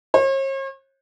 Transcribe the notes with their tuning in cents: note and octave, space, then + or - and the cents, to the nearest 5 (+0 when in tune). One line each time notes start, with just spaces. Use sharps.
C#5 -45